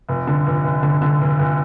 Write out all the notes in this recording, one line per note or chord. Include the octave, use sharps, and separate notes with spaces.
F1
D3
F1
F1
D3
D3
F1
F1